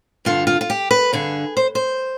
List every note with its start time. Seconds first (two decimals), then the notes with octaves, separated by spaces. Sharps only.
0.25 G2 D3 F4
0.47 F4
0.61 F4
0.70 G4
0.91 B4
1.13 G2 D3 G#4
1.57 C5
1.75 C5